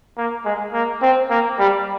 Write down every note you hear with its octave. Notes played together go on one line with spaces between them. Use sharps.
A#3
G#3
A#3
C4
A#3
G3